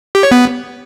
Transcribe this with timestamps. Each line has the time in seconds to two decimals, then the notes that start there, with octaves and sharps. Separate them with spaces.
0.15 G4
0.23 C#5
0.31 B3